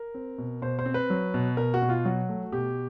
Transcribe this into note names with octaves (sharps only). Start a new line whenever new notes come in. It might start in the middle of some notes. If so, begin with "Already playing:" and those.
Already playing: A#4
C4
B2
B2 C5
C5
C4
B4
F#3
B2
B2 A#4
F#4
B2
F4
F#3 F#4
A3
B2 G4